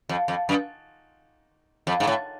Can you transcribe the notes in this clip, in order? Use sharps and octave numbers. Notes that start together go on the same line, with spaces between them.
F2
F2
F#2
F2
G#2
A2